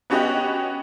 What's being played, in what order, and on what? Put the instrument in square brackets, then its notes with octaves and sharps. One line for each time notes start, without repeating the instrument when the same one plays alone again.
[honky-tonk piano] B3 C#4 F#4 G4 D#5